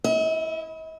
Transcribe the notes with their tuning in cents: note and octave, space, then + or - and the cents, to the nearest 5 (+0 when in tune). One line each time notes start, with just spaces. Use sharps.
E4 -5 D#5 +45